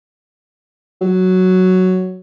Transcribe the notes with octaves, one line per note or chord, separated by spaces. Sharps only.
F#3